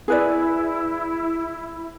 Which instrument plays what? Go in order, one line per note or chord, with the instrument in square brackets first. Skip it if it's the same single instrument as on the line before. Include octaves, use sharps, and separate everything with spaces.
[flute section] E4 [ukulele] G#4 B4 D5